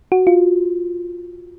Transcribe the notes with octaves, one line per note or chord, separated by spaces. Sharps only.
F#4
F4